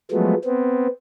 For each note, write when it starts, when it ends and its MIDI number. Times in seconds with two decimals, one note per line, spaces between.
0.12 0.34 53
0.12 0.34 54
0.12 0.34 56
0.12 0.34 57
0.12 0.34 59
0.45 0.87 59
0.45 0.87 60